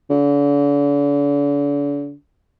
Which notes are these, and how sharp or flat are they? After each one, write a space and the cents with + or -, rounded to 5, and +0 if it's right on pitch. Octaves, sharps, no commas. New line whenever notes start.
D3 -40